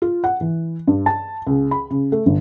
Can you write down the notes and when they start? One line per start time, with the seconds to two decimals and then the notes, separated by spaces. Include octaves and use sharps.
0.02 F4
0.24 F#5
0.41 E3
0.87 G2
1.06 A5
1.47 C#2
1.71 B5
1.90 C#3
2.12 A3
2.26 G1